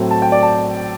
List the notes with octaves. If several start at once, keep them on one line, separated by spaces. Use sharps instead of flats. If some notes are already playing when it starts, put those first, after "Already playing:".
Already playing: A2 F#3 A3 C4
A5
G5
D5
A5